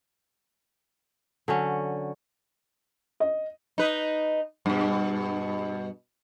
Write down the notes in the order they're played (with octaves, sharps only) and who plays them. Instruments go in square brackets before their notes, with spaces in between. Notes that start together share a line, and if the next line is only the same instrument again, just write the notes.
[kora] D3 F#3 C#4
[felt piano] D#5
[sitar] D#4 B4
G2 B2